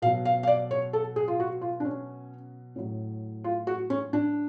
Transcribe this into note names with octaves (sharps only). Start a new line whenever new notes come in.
B2 F#3 F5
F5
F5
D5
C#5
A4
G#4
F4
F#4
F4
D4
C#4
A2 F#3
F4
F#4
C#4
D4